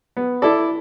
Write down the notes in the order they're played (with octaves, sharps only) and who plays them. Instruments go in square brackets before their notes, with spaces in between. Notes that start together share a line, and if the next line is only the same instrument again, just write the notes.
[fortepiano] B3
E4 A4 D5